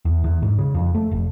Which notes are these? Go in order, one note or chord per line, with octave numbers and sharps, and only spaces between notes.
E2
E2
G#2
C#3
F2
A3
F1